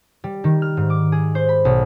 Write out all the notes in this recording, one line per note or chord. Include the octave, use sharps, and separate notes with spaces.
G3
D#3
F6
G#2
D6
G#4
C5
B5
B1